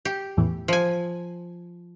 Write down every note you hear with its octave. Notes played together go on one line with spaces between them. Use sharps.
G4
E2 A2 E3
F3 G#5